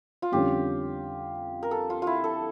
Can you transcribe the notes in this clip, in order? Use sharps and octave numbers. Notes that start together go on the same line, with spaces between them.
F4
F2 D3 G3 C#4 G4
A#4
A4
F4
E4 F4
A4